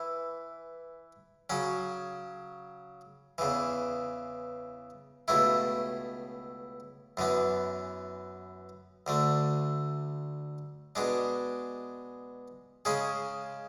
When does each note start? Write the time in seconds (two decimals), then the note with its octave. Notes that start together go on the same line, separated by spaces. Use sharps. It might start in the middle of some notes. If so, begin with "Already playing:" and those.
Already playing: E3 E4
1.50 C#3 F#3 C#4
3.38 E2 C#3 E3
5.28 C#2 B2 A3 E4
7.17 F#2 E3 B3
9.07 D2 D3 A3
10.95 B2 G#3 D4
12.85 C#3 G#3 C#4 G#4